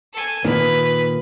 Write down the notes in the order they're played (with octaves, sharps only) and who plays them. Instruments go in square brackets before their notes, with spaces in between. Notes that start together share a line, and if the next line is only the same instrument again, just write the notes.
[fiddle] A4 G#5
[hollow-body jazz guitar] A#2 D#3 A#3 [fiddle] B4